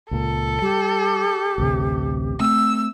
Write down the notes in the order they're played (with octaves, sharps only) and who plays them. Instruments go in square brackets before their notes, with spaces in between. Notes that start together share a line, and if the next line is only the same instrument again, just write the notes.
[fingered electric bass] C#2 A#2 [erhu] A4
[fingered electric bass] G3 [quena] G4
[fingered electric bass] A1 D2 C3
[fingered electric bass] A3 C4 [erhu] E6